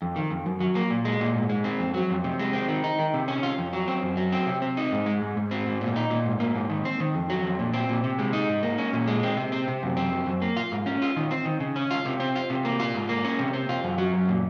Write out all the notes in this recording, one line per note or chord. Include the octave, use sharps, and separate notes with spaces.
F2
D#3
F2
F#2
F#3
A#3
A#2
G#3
A#2
G#2
G#3
C4
F2
F#3
F2
C3
G#3
C4
D#3
D#4
D#3
C3
C#4
F4
F2
F#3
C4
F#2
F#3
C4
C3
C4
D#4
G#2
G#3
G#2
G#2
C4
G#2
A#2
D#4
A#2
G#2
A#3
G#2
D#3
C4
D#3
F2
F#3
F2
A#2
C4
A#2
C3
G#3
D#4
G#2
A#3
C#4
A#2
G#3
C4
C3
C4
C3
F#2
C4
F#2
F#2
A#3
F4
G#2
C#4
F4
D#3
C4
D#3
C#3
C#4
F4
C3
C4
F4
C3
A#3
F4
G#2
A#3
C#4
C3
C4
F4
F#2
F#3
F#2
A#2